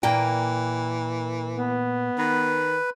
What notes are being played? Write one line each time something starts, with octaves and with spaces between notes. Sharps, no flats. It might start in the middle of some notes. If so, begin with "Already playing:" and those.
A#2 E3 A#3 G5
B3
D#3 B4